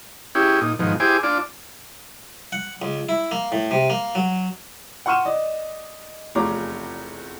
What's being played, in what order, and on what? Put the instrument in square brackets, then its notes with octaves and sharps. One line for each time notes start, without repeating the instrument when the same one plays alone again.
[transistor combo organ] C#4 E4 G4 G#4
A#2 D#4
G#2 B2 D#3 F3
E4 G4 G#4 C5 G#5 D6
D4 F4 D5
[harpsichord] F#5
C#2
E4
A#3
A2
C3
A#3
F#3
[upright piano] F#5 C6 C#6 F6 D#7 E7
D5 D#5
F1 E2 F4 C#5 A#5 D6